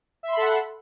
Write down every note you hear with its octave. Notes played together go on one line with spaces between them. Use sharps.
A4 E5 F#5 B5 C6